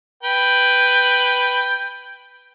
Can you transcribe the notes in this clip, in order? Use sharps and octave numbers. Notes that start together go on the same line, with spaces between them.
B4 G5